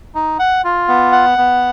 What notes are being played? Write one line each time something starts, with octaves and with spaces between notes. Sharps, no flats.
D#4
F#5
F4
B3
F#5
B3